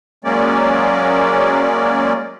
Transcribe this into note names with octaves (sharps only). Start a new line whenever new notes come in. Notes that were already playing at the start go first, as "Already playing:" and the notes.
F#3 G#3 A#3 C#4 D5